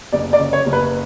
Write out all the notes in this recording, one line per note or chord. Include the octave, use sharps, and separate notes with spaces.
F#1 D5
D5
C#3
C#5
F#1
B4